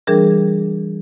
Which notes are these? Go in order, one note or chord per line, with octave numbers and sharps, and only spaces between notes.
E3 G3 D4 G#4 A#4